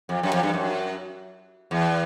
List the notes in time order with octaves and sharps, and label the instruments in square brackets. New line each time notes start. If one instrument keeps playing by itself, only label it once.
[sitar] F2
F#2
F2
G2
F#2
E2